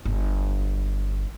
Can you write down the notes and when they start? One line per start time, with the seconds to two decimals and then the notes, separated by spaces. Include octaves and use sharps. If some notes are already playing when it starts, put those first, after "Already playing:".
0.05 G1